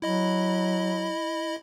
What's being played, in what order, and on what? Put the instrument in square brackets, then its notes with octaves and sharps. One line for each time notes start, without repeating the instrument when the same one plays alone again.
[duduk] F#3 [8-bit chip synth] E4 D#5 B5